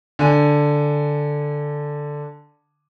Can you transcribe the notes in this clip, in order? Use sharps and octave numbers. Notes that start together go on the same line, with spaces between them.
D3 G#5